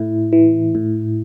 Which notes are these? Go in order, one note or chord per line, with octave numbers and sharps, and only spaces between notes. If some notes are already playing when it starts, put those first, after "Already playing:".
Already playing: A2 E4
E3
A2